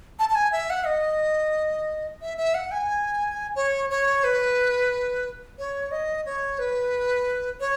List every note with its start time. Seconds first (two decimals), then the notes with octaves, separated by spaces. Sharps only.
0.19 A5
0.29 A5
0.35 G#5
0.52 E5
0.70 F#5
0.86 D#5
2.22 E5
2.38 E5
2.54 F#5
2.72 G#5
3.56 C#5
3.90 C#5
4.24 B4
5.59 C#5
5.91 D#5
6.26 C#5
6.59 B4
7.60 C#5